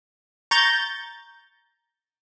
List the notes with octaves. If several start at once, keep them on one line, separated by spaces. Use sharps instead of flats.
A#5 C#6 G6 A6